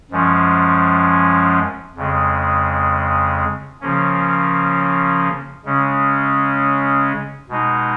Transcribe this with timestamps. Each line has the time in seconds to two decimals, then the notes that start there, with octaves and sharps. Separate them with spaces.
0.11 F#2 F3 G#3 C#4
1.96 F2 C#3 G#3
3.81 C#3 F3 A#3 C#4
5.65 C#3 G#3 C#4
7.49 B2 G#3 D#4